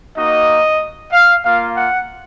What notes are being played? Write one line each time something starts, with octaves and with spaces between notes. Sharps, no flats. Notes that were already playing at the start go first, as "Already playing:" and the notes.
A#3 D#4 F#4 D#5
F5
A#3 F4 F5
F#5